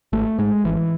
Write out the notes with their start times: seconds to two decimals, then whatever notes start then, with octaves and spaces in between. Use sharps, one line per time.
0.13 G#1 A3
0.38 G#2 G#3
0.64 G#1 E3